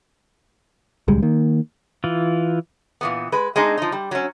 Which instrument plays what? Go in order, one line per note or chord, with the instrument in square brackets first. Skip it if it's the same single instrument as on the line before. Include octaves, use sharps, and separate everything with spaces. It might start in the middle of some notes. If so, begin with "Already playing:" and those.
[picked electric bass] D#1 C#2 G3 G#3
D#3 A#3
[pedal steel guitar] E3 F4
[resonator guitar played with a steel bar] A#2 E3 B3
G#3 B4
G#3 C4 D4 D#4
F3 D#4
G3
F#3 C#4